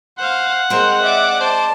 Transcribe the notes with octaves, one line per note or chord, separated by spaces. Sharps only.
C5 F5 F#5
G#3 C4 A#4 C5
D5 E5 D6
C5 A5